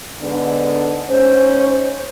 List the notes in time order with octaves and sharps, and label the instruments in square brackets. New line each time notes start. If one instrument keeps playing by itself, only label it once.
[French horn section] G#2 D3 B3
[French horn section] G#2 C#4 C#5 [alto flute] C5